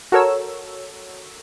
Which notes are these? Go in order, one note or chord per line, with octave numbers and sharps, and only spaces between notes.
F#4 A4 A#4 C#5 E6